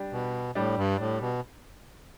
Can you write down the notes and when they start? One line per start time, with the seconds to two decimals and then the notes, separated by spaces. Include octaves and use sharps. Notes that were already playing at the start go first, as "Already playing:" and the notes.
Already playing: G3 D4 G4
0.12 B2
0.55 A2 G3 D4 G4
0.77 G2
0.99 A2
1.21 B2